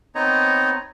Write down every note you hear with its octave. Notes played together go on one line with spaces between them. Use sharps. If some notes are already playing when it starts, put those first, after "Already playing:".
B3 C4 D#4 C#5 D#5 A#5